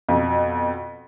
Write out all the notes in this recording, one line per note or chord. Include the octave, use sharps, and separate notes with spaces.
F2 B2